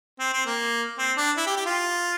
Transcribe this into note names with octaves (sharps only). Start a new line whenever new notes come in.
C4
C4
A#3
C4
D4
E4
G4
G4
F4